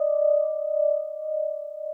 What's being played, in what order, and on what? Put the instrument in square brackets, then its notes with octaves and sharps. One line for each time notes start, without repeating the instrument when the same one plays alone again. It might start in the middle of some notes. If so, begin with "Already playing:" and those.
Already playing: [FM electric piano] D5 D#5